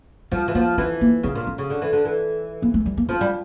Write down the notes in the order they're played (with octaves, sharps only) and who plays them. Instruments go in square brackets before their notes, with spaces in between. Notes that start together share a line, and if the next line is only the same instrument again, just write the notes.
[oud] F3 [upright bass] G3
[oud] E3
[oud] F3 [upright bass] A#3
[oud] E3 [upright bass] C#4
[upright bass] A#3
[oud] C#3 [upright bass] C#4
[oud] A#2
[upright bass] C#4
[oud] C#3
D3
E3
D3
E3
[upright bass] A#3
A3
G3
A#3
[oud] F3 [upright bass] C#4
[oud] G3